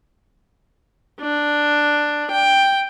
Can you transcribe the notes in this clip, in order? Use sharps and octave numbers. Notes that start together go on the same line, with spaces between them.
D4
G5